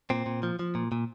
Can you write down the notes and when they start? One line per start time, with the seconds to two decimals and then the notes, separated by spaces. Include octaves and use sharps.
0.10 A#2 C4
0.26 A#2
0.43 F3
0.59 F3
0.75 A#2
0.92 A#2